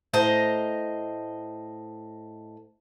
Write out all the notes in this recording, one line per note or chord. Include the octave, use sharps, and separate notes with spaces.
A2 C5 D#5 A#5